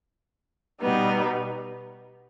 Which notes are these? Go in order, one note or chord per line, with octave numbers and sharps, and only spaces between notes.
B2 G3 B3 D#4